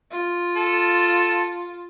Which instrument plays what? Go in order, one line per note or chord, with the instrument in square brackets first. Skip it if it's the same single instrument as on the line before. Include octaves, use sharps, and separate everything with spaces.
[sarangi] F4
[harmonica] A4